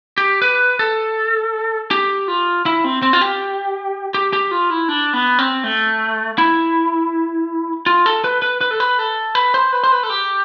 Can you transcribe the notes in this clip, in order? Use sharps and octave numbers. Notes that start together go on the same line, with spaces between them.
G4
B4
A4
G4
F4
E4
C4
C4
F4
G4
G4
G4
F4
E4
D4
B3
C4
A3
E4
F4
A4
B4
B4
B4
A4
B4
A4
B4
C5
B4
C5
B4
A4
G4